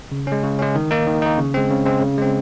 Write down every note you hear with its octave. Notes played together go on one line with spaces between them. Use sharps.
C#3
G#3 C#4
C#3
G#3 C#4
D#3
A#3 D#4
D#3
A#3 D#4
C#3
G#3 C4
C#3
G#3 C4
C#3
G#3 C4